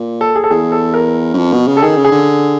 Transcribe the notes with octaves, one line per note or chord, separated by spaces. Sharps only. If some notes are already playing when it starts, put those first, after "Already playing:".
Already playing: A#2
A4
G#4
A4
E2 G#4
A4
A#4
F#2
F2
B2
C#3
A4
D#3 G#4
C#3
G#4
D3